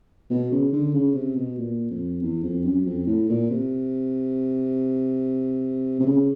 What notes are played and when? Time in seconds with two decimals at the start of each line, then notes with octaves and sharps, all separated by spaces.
0.30 B2
0.52 C#3
0.73 D3
0.94 C#3
1.15 C3
1.36 B2
1.58 A#2
1.91 F2
2.22 E2
2.43 F2
2.65 F#2
2.86 F2
3.07 A2
3.29 A#2
3.50 C3
6.00 C3
6.06 C#3